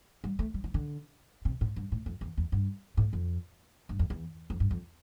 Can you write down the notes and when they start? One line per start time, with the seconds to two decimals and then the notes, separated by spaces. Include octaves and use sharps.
0.24 G3
0.39 A3
0.54 G3
0.64 E3
0.74 D3
1.45 C3
1.61 A2
1.76 G2
1.92 A2
2.06 F2
2.21 E2
2.37 E2
2.52 G2
2.97 A2
3.13 F2
3.89 G2
3.99 F2
4.10 E2
4.50 F2
4.60 G2
4.71 F2